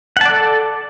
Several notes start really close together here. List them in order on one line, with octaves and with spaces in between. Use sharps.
F#5 A5 D5 A4